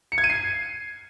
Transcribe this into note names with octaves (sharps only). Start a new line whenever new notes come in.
C#7
G#6
D#7
C7